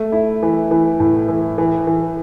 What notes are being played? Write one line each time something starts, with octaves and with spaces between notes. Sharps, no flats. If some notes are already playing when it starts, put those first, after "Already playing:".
Already playing: A3
E4
E3
E3
A2
E3
E3
E3